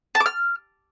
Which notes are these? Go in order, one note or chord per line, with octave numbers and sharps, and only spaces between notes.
A5
D6
F6